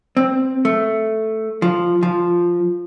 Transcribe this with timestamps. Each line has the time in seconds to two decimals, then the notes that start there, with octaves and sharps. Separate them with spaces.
0.17 C4
0.65 A3
1.62 F3
2.03 F3